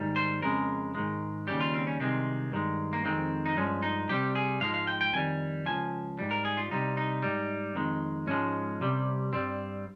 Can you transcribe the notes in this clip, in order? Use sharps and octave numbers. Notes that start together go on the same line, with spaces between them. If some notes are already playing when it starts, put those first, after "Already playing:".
Already playing: G#2 D#3 G3
C5
F2 C#3 G#3 A#4
G#2 D#3 G#3
D#2 C#3 G3 G4
F4
C4
C#4
C2 C3 D#3 G#3 C4
G2 D#3 G#3
A#3
F2 D#3 G#3 C4
D#4
G2 F3 G#3 C#4
D#4
C2 C3 G3 G4
G#4
G#2 F3 G#3 F5
F5
G5
G5
F2 D#3 G3 G#5
C#2 C#3 F3 G#5
G#2 G3
A#4
G#4
F4
C2 C3 G3 D#4
D#4
G#2 G3
F2 D#3 G#3
G#2 F3 G#3 C#4
C2 C3 G3
G2 G3 C4